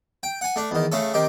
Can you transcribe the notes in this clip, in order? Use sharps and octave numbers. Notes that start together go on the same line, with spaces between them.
G5
F#5 G#5
A3 D4
E2 D#3
C#3 A3 C#4 A4
C3 D#3 G4